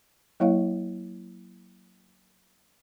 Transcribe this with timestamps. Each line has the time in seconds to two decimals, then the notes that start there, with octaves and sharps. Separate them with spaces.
0.40 F#3 A#3 E4 C#5 D#5 F5